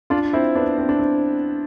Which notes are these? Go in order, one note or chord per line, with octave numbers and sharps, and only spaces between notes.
D4 F4
C4 E4
B3 D4
C4
D4
C4